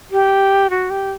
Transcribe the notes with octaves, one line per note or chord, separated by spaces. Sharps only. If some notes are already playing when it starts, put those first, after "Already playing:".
G4
F#4
G4